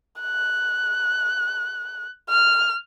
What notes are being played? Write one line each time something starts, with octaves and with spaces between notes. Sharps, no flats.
F#6
F6